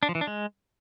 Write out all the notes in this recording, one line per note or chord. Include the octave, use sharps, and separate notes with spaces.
D4
F3
E3
D4
G#3